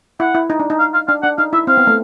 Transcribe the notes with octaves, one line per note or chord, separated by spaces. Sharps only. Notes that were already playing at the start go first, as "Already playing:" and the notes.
E4 F#5
E4
D#4
D4
D#4
F5
F5
D4 F5
D4 F#5
D#4 F5
E4 E5
C4 F5
B3
A3